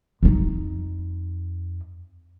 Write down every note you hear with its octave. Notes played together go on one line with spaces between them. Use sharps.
F2 D#4